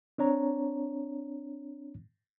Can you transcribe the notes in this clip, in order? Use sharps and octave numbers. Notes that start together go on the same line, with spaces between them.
C4 D4 C#5 A#5